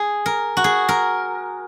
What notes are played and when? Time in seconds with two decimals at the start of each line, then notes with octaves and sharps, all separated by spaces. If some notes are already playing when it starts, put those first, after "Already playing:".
Already playing: G#4
0.26 A#4
0.57 F#4
0.64 G#4
0.89 A#4